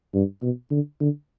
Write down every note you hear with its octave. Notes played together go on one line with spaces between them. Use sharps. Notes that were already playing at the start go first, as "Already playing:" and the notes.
G2
B2
D3
D3